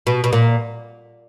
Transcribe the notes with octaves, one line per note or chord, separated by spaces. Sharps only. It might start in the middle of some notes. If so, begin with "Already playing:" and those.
B2
B2
A#2